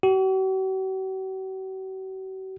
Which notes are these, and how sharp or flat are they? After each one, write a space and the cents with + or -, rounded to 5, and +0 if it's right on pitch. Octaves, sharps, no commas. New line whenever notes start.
F#4 +45